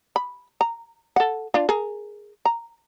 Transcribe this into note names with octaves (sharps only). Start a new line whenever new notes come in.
B5
A#5
A4 F#5
D4 F4
G#4 A#4
A#5